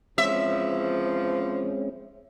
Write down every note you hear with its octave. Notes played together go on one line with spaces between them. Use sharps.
E2 C#3 F3 G#3 C4 C#4 E5